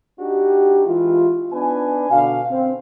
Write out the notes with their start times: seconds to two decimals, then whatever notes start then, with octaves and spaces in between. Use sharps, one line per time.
0.20 D4 D#4 F#4 G4
0.86 E3 G#3 E4 F4
1.52 B3 D4 D#4 B4 G#5
2.11 B2 D3 D4 F#4 F5
2.50 C4